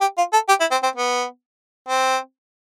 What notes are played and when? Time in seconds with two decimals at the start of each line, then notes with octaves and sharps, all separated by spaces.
0.01 G4
0.17 F4
0.33 A4
0.48 G4
0.60 E4
0.71 C4
0.83 C4
0.95 B3
1.88 C4